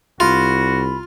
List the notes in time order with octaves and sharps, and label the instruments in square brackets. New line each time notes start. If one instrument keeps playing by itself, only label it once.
[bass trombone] C2 [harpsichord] F4 [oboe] F#4 [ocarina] B5